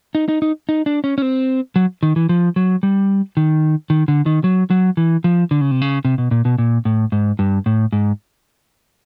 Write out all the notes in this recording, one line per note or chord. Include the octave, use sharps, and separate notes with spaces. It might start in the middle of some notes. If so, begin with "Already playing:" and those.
D#4
D#4
D#4
D#4
D4
C#4
C#4
C4
F#3
D#3
E3
F3
F#3
G3
D#3
D#3
D3
D#3
F#3
F#3
E3
F3
D3
C#3
C3
C#3
C3
B2
A#2
B2
A#2
A2
G#2
G2
A2
G#2